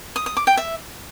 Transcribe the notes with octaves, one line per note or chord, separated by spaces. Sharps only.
D#6
D#6
D6
G5
E5